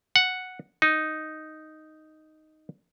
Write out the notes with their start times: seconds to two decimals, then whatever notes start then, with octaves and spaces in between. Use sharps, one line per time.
0.16 F#5
0.82 D#4